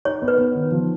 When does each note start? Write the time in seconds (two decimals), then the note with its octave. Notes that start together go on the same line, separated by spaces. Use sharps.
0.05 D#4 C#5
0.22 B3
0.28 B4
0.39 B3
0.55 D#3
0.72 F3